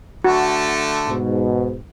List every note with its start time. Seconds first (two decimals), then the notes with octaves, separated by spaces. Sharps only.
0.24 D3 A3 F#4
1.07 G#2 B2